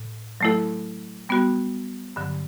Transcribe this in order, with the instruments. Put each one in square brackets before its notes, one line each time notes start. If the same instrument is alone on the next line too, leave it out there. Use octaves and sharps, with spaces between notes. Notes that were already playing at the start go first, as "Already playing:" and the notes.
Already playing: [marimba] A2
F#3 A3 E4 A4
G3 B3 F#4
G2 D3 F#3